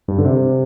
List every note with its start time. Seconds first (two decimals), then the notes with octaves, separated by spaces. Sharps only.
0.08 G2
0.18 D3
0.25 C3